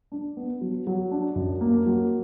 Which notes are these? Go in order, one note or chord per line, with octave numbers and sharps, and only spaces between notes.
D4
B3
F#3
F#3
D4
F#2
A#3
F#3